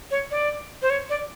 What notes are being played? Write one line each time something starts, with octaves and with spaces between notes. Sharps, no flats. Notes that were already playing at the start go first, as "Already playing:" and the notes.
C#5
D5
C5
C#5
D5